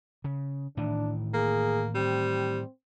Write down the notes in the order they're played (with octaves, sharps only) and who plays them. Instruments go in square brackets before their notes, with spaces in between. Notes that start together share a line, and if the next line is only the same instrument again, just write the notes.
[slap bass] C#3
[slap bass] A2 D#3 E3 [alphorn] D4
[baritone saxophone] A#3 [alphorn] G#4
[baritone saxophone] G3 [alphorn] C4